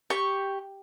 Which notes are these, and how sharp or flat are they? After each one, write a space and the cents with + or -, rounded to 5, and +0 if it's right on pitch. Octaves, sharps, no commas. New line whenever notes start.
G4 +0 C#6 +0